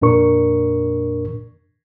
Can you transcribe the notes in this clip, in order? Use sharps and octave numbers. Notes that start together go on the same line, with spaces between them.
F2 A#2 D4 A#4 C#6